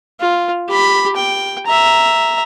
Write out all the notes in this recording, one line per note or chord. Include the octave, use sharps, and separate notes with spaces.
F4
G4 B5
G5
E5 A#5